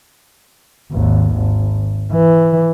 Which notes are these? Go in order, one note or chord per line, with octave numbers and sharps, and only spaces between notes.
G#1 D#2
G#1
E3